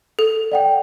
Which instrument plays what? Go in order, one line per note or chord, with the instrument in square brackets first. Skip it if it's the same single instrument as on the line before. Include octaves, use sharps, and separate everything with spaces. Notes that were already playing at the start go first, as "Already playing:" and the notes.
[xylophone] A4
[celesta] D5 F#5 G5